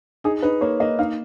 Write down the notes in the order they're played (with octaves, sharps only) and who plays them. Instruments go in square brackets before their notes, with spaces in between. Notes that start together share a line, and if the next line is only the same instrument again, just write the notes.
[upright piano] D#4 [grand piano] G#4
[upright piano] D#4 [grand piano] B4
[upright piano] A#3 [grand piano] C#5
[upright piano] A#3 [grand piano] D#5
[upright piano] D#4 [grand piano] F5